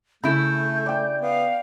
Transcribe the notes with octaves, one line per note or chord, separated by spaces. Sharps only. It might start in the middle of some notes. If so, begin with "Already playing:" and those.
C#3 A3 E4 B5 G6
D5 G5
B3 F5